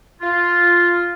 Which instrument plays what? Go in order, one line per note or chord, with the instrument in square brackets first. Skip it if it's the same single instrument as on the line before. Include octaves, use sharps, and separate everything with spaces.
[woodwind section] F4